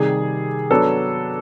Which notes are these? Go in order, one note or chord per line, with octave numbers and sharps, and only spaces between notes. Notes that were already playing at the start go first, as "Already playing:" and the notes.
Already playing: C3 D#3 G3 G#4
F#3 B3 D4 A4